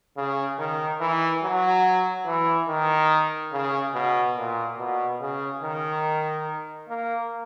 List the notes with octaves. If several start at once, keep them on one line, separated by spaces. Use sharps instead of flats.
C#3
D#3
E3
F#3
E3
D#3
C#3
B2
A#2
B2
C#3
D#3
A#3